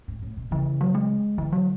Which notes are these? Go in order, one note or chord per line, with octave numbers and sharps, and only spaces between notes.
G#2
A2
B2
C#3 E3
F#3
G#3
D3 E3
F#3